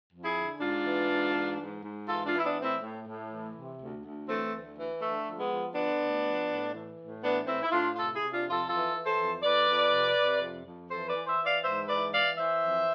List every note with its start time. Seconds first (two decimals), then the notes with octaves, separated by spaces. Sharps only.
0.12 F2
0.23 E4 G#4
0.36 D3
0.60 G#2 D4 F4
0.85 E3
1.09 G#2
1.34 E3
1.58 G#2
1.83 G#2
2.07 E3 F4 A4
2.25 D4 F4
2.31 E3
2.38 E4
2.44 B3 D4
2.56 A2
2.62 C4 E4
2.81 A2
3.06 A2
3.30 E3
3.55 C3
3.80 D2
4.04 D2
4.28 E3 A3 C4
4.52 D2
4.77 E3
5.01 D3 A3
5.26 F3
5.38 G#3 B3
5.51 F3
5.74 D3 B3 D4
6.00 D2
6.24 F3
6.49 A2
6.73 E3
6.98 A2
7.22 E3 B3 D4
7.46 A2 C4 E4
7.62 E4
7.71 A2 D4 F4
7.95 C3 F4 A4
8.14 E4 G#4
8.20 C3
8.32 D4 F4
8.45 F2
8.50 F4 A4
8.69 E3 F4 A4
8.94 E3
9.06 A4 C5
9.19 F2
9.43 F2 B4 D5
9.67 F2
9.92 C3
10.17 C3
10.41 F2
10.65 F2
10.90 E3 A4 C5
11.08 B4 D5
11.14 E3
11.27 C5 E5
11.39 E3
11.45 D5 F5
11.63 G#2 C5 E5
11.87 E3 B4 D5
12.12 E3 D5 F5
12.37 E3 C5 E5
12.62 F2